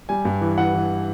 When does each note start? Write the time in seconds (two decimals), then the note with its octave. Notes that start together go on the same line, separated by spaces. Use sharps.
0.09 G3 G#5
0.25 G2
0.41 E3
0.58 E3 F#5
0.74 E3